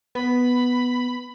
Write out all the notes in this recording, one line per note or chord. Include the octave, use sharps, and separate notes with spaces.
B3 B5